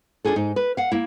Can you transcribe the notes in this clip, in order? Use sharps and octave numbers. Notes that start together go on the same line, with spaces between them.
D4 D#4 F4 G#4 A4
G#2 D#4
B4
F5 F#5
A#3 E4